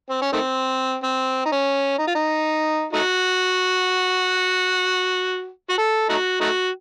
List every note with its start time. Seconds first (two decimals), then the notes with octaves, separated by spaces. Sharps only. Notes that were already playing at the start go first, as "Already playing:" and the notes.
0.10 C4
0.22 C#4
0.33 D#3 A3 C4
1.03 C4
1.46 D#4
1.52 C#4
1.98 D#4
2.07 F4
2.15 D#4
2.93 A3 D#4 F#4
5.70 F#4
5.78 A4
6.09 A3 D#4 F#4
6.41 A3 D#4 F#4